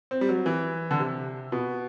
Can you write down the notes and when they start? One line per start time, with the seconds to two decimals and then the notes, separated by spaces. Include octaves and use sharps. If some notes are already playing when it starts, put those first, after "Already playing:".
0.11 C4
0.21 G3
0.29 F#3
0.46 E3
0.91 D3
0.99 C3
1.52 B2